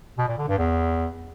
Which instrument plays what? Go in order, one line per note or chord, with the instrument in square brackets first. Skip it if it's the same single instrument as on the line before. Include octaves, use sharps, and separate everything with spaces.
[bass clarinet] B2
A#2
D3
G2
E2